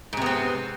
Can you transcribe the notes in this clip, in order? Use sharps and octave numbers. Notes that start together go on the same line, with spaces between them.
G#2 C3 B3 C4